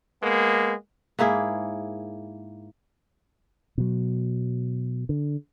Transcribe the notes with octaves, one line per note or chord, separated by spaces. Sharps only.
G#3 A#3 B3
G#2 A#3 E4 G#4
B2 F#3
D3